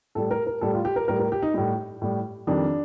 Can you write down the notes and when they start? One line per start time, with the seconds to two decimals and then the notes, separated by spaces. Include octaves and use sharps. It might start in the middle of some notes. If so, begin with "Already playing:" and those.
0.15 A2 G3 A4
0.31 A#4
0.47 A#4
0.61 A2 G3 A4
0.73 F4
0.85 G4
0.96 A#4
1.08 A2 G3 A#4
1.20 A#4
1.32 G4
1.42 D#4
1.54 A2 G3
2.02 A2 G3
2.47 F2 D#3 G3 D4